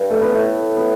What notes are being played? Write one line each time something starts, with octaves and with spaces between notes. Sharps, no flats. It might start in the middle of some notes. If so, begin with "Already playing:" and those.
Already playing: G2
A3
B3
A2 A3
B3